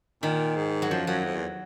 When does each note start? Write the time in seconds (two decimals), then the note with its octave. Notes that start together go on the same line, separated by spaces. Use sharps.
0.23 A#2 D#3
0.56 G#2
0.82 F#3
0.90 F#2 F3
1.07 F#2 F#3
1.25 F2
1.35 E2